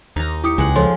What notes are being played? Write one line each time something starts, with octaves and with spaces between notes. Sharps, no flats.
D#2 D#4 A#5
E4 G4 D#6 C#7
C#2 G#3 F#5
F3 A4 C#5 C6